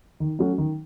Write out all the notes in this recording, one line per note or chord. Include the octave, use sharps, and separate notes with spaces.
D#3
F#3 A3 C#4 F#4
D#3